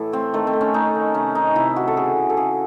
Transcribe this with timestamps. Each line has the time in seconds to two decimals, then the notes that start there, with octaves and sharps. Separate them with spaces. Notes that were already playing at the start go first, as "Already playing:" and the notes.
Already playing: A2 E3 E4 A4
0.12 A3 C4
0.33 D#3 A3
0.47 C4
0.53 A3
0.61 C#4
0.74 A3 D#4
0.95 D#3
1.14 C3 C#4
1.35 D#3 D#4
1.55 C3 E4
1.76 F#3 F#4
1.88 A4
1.96 C#3 G#4
2.16 E3
2.30 A4
2.37 C#3 G#4